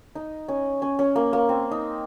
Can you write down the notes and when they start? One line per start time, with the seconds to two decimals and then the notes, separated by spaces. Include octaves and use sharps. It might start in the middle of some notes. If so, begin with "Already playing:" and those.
0.15 D#4
0.48 C#4
0.82 C#4
0.99 C#4
1.16 A#3
1.33 A#3
1.49 C4
1.71 D#4